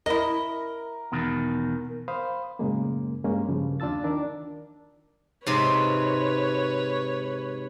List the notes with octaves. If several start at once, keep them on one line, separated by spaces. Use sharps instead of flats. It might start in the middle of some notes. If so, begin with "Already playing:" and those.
E4 A#4 D#5
E2 B2 D#3
C5 F5 B5 D#6
F#2 A2 C#3 G#3 A#3
G2 G#3 A#3 C#4
G2 C#3 F3
D#2 D4 F4 A5 E6 A6
D#3 D4 A#4
G#2 C3 B4 C#5